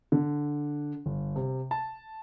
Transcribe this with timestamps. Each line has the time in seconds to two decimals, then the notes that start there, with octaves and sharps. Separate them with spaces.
0.12 D3
1.06 G1
1.36 C3
1.71 A5